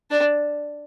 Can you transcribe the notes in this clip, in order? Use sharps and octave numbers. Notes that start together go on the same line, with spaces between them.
D4